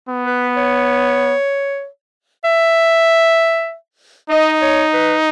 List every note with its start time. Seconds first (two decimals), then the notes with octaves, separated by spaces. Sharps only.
0.09 B3
0.26 B4
0.57 C#5
2.44 E5
4.30 D#4 D#5
4.62 C#5
4.93 B4